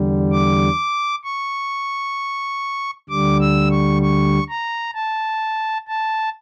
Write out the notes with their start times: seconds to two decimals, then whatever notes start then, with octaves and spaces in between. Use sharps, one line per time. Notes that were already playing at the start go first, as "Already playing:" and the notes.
Already playing: E2 D3 G3
0.32 D6
1.24 C#6
3.09 D2 D3 G3 D6
3.40 E6
3.71 C#6
4.03 C#6
4.49 A#5
4.94 A5
5.88 A5